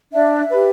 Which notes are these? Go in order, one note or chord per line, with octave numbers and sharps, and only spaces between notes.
D4 E5
G4 B4